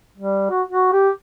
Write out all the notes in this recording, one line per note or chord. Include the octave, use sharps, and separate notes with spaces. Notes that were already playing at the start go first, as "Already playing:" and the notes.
G3
F#4
F#4
G4